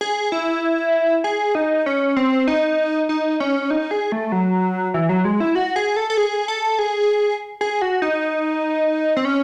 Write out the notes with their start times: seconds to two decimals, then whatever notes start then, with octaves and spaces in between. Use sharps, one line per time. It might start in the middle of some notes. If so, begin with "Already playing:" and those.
0.01 G#4
0.32 E4
1.24 G#4
1.55 D#4
1.86 C#4
2.16 C4
2.48 D#4
3.09 D#4
3.40 C#4
3.71 D#4
3.91 G#4
4.12 A3
4.32 F#3
4.94 E3
5.09 F#3
5.25 G#3
5.40 E4
5.55 F#4
5.76 G#4
5.96 A4
6.10 A4
6.17 G#4
6.48 A4
6.79 G#4
7.61 G#4
7.82 F#4
8.02 D#4
9.17 C4
9.25 C#4